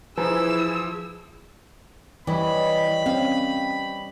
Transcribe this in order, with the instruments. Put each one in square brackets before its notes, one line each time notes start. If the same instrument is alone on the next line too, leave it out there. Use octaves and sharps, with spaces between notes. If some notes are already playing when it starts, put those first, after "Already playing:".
[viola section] E3 E4 G#4 [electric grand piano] F3 [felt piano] B4 G#5 A#5 [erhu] E6
[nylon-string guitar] E3 [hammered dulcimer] G3 C#5 D#5 [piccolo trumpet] B5
[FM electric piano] C4 C#4 G5 [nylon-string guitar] F5